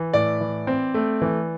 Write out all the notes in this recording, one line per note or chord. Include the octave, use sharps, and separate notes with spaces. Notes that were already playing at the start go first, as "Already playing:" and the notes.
Already playing: E3
A2 D5
E3
C4
A3
E3